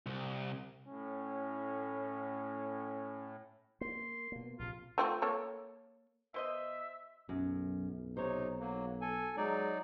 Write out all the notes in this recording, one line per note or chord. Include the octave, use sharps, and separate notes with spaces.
C2
A2 C#4
A#3 C6
B2 A#3
A#1 C3 F4
A3 C4 F4
A#3 A4 C#5
B2 C5 D#5 E5
B1 F#2
C3 D#4 C5 C#5
F#3 A#3
A4 G#5
F#3 G#3 D#4 D5